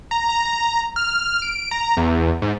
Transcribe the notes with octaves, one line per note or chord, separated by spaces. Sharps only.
A#5
A#5
A#5
F6
D7
A#5
E2
G#2